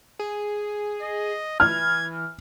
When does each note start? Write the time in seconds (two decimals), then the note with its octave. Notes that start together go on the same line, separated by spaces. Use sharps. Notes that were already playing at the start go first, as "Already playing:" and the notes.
0.19 G#4
1.02 D#5
1.60 E3 F6 G#6